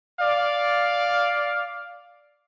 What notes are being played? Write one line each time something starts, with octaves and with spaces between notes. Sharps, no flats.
D5 F5